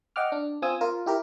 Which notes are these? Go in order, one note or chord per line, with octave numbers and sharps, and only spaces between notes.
D#5 F#5 G5 D6 F6
D4
C4 F4 G#5 D#6 E6
F4 A#4
E4 G4 A#4